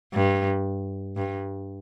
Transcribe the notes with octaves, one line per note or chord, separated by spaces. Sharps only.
G2
G2